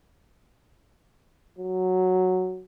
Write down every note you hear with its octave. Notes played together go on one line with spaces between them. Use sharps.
F#3